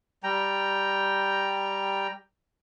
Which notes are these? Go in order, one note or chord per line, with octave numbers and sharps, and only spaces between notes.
G3 G5 A#5